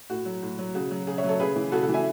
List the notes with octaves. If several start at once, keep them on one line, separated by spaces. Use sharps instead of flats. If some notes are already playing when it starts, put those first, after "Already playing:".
A2 F#4
F#3
A2
F#3
C#3 F#4
F#3
C#3 G#4
C#5 E5
F#3
A4 C#5
C#3 G#4 B4
E3
C#3 F#4 A4
F#4 A4
E3
E5 G#5